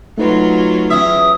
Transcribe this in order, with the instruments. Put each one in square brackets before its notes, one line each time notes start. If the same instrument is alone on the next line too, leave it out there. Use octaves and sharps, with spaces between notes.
[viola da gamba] F#3 F4 F#4 [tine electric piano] A3 D#4 B4
[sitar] E2 C#4 E5 [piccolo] D#6